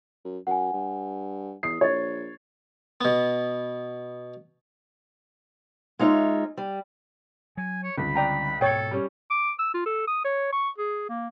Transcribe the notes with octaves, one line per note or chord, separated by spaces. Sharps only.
F#2
F#2 F#5 G#5
G2
E2 D#6 C7
A#1 C#5 G#6 A6
B2 B3
G#3 D#4 F4 C#5 E5
G3
F#3 G#5
C#5
C#2 D3 G3 C4 B5
D5 G5 A#5
G#2 B2 A4 C#5 G5
G3 C#4
D6
E6
F4
A4
D#6
C#5
C#6
G#4
A#3